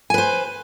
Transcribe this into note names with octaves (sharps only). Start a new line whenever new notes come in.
B4 C5 G#5